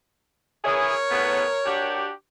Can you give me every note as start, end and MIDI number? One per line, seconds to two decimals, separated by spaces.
0.65 0.93 59
0.65 0.93 64
0.65 0.93 68
0.65 2.04 70
0.65 2.04 73
1.10 1.44 45
1.10 1.44 49
1.10 1.44 59
1.66 2.10 62
1.66 2.10 66
1.66 2.10 67